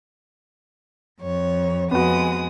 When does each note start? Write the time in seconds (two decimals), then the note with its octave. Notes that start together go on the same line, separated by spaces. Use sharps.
1.20 F2 C#5
1.91 F2 G#3 B3 F#4 D#6